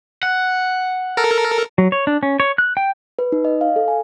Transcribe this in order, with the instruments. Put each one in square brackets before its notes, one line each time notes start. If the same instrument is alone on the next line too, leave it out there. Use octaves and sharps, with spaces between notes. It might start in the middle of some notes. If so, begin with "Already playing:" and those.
[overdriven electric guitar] F#5
[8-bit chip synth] A4 A#4
[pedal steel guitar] F#3
C#5
D4
C#4
C#5
F#6
G5
[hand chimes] B4
D#4
D#5
F5
A4
G#5